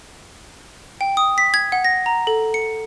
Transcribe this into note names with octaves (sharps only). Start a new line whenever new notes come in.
G5
D#6
B6
G#6
F#5
A#6
A#5
A4
C#7